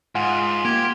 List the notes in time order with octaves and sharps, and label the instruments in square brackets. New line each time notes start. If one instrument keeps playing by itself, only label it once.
[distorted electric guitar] G#2 [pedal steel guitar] F4 [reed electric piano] F#5 G#5
[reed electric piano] A#3 [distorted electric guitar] G4 [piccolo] G#6